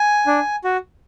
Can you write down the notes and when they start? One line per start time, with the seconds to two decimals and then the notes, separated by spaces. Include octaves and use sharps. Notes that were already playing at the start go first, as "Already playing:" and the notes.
Already playing: G#5
0.27 D4
0.64 F#4